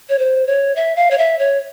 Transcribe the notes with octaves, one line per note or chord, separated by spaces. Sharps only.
C#5
C5
C#5
E5
F5
C#5
E5
C#5